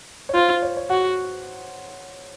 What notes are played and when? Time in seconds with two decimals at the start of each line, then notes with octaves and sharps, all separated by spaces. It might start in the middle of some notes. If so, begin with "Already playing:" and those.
0.29 C#5
0.34 F4 C5
0.49 C5
0.62 C#5
0.77 C#5
0.90 F#4 F#5